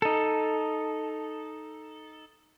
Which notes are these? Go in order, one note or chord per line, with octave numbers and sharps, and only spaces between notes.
D#4 A4